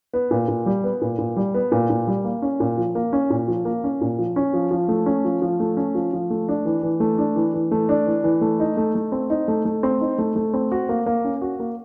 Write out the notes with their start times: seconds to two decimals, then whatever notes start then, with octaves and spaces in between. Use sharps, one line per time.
0.13 B3
0.31 A#2
0.48 A#2
0.66 G3
0.84 B3
1.02 A#2
1.18 A#2
1.36 G3
1.54 B3
1.72 A#2
1.90 A#2
2.07 G3
2.24 A#3
2.42 C#4
2.60 A#2
2.77 F3
2.95 A#3
3.13 C#4
3.30 A#2
3.48 F3
3.65 A#3
3.84 C#4
4.01 A#2
4.18 F3
4.36 C#4
4.53 F3
4.71 F3
4.88 A3
5.06 C#4
5.25 F3
5.42 F3
5.60 A3
5.77 C#4
5.95 F3
6.13 F3
6.30 A3
6.48 D4
6.65 E3
6.83 E3
7.00 A3
7.18 D4
7.36 E3
7.54 E3
7.71 A3
7.89 D4
8.06 E3
8.24 E3
8.41 A3
8.60 D#4
8.77 A3
8.95 A3
9.12 C4
9.30 D#4
9.48 A3
9.65 A3
9.83 C4
10.01 D#4
10.18 A3
10.36 A3
10.54 C4
10.72 F#4
10.89 A#3
11.06 A#3
11.24 C#4
11.42 F#4
11.59 A#3